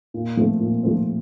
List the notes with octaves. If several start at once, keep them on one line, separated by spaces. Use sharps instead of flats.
A#2
F3 A3 C4
A#2
F3 A3 C4